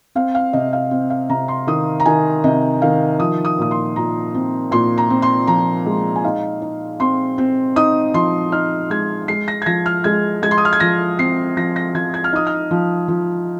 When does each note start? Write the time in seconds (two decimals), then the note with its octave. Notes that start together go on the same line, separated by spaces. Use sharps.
0.15 C4 F5
0.35 F5
0.53 C3 D#5
0.73 F5
0.91 C4
1.10 F5
1.29 C3 A#5
1.48 C6
1.67 D#3 D#6
2.00 A#5
2.06 D#3 G#5
2.44 C3 D#5
2.82 D#3 F5
3.20 F3 D#6
3.45 D#6
3.58 A#2 D#6
3.71 C6
3.96 A#2 A#5
4.34 C4
4.72 A#2 C6
4.98 A#5
5.10 C4
5.22 C6
5.47 F3 A#5
5.86 G#3
6.16 G#5
6.24 D#4 F5
6.62 D#4
7.00 C4 C6
7.38 C4
7.76 D#4 D#6
8.14 F3 C6
8.52 D#4 F6
8.90 G#3 G#6
9.28 G#3 C7
9.48 A#6
9.62 G#6
9.66 F3 A#6
9.86 F6
10.04 G#3 G#6
10.42 G#3 G#6
10.51 C6
10.58 D#6
10.65 F6
10.73 G#6
10.80 F3 A#6
11.19 C4 C7
11.57 F3 A#6
11.76 A#6
11.95 F3 G#6
12.14 G#6
12.24 F6
12.33 D#4 D#6
12.47 F6
12.71 F3
13.08 F3